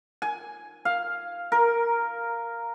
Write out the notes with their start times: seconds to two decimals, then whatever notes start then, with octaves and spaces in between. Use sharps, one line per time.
0.22 G#5
0.85 F5
1.52 A#4